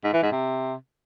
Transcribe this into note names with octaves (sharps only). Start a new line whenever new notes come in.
G#2
E3
G#2
C3